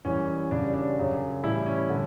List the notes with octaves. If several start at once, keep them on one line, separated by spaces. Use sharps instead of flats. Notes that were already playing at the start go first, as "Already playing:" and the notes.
F#2 E3 G3 C#4
F#2 C#3 G3 D4
D4
F#2 C#3 F#3
A2 E3 G3 E4
C#4
D3 G3